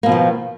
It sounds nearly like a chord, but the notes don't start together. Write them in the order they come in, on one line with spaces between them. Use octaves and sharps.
A#3 B2 F3 D#3